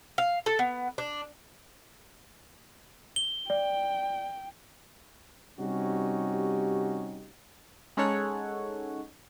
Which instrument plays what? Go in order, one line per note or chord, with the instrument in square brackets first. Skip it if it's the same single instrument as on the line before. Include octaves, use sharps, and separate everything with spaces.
[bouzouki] F5
A4
B3
D4
[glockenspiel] G7
[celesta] D5 [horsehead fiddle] G5
[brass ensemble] C3 G3 C#4 D#4 F#4 G4
[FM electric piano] G#3 C#4 D#4 A4 C#5 F#5